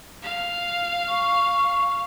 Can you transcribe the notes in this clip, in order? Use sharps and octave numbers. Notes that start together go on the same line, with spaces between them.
F5
C#6